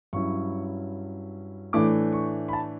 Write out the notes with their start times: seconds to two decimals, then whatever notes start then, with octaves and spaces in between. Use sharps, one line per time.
0.13 G2 F#3 C#4 E4 C#6
1.73 A2 E3 A3 D4 D6
2.13 C#6
2.48 B5
2.53 A5